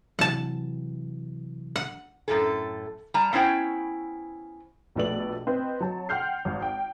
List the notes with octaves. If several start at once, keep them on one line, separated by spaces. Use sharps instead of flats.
C3 E3 F#3 F#5 A5
F#5
F#2 A2 A4
G3 A5 A#5
B3 C#4 E4 C5 G5
A#1 B2 A3 B4 D5 F#7
C4 B4 D#5
F#3 A5
F#5 G5 C6 F6 G6 C7
G#1
G5